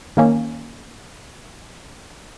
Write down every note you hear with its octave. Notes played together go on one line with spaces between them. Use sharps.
D#3 A#3 C#4